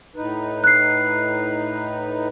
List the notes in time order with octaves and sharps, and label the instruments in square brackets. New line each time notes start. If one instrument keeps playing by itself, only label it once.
[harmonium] A2 D#4 B4
[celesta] F#6 C7